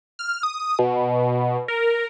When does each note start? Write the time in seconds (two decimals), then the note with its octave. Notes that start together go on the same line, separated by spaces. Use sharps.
0.19 F6
0.43 D#6
0.79 B2
1.68 A#4